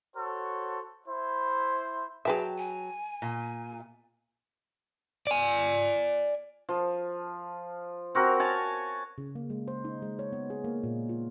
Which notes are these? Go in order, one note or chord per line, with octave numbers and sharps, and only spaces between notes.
F#4 A4 C5 C#5
E4 C5
F#3 G#4 B4 E5 G5 A5
G#5
A#2
D5 G#5
F3
C4 F#4 A#4
C#5 G#5 A5
C#3
A#3
G#3
C5
D#4
G#3
C#5
B3
G#4
A#3
A#2
F4